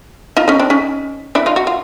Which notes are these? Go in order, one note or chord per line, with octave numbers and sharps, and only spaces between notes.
D#4 F4
C#4 D#4
C4 D4
C#4 D#4
D4 E4
D#4 F4
F#4
F4